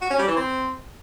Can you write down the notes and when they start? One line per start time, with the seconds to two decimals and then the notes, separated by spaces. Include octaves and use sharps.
0.01 F#4
0.10 C#4
0.19 G3
0.28 E3
0.36 C4